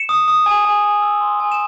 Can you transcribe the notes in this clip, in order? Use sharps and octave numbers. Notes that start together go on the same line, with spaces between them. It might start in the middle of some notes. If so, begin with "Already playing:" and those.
Already playing: C#7 E7
D#6
D#6
G#5
G#5
G#5
E6
C6
G#5
E7